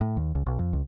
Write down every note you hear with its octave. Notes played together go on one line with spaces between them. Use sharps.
A2
D#2
C#2
B1
F2
C#2